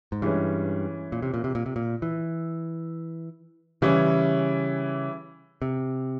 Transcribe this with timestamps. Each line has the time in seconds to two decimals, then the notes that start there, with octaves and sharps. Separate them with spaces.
0.12 G#2
0.22 G2 E3 G#3 C#4
1.12 A#2
1.22 C3
1.34 A#2
1.44 C3
1.55 A#2
1.66 C3
1.76 A#2
2.02 E3
3.82 C#3 E3 G3 C#4 E4
5.62 C3